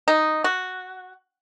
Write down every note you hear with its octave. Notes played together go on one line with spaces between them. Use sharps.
D#4
F#4